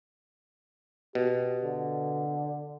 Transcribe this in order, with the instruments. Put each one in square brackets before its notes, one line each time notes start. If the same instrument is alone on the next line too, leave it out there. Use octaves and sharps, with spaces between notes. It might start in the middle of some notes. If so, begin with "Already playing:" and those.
[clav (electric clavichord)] B2 [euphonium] G4
[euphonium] D3